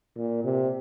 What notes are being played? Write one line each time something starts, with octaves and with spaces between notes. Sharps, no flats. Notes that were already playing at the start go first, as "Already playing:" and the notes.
A#2
C3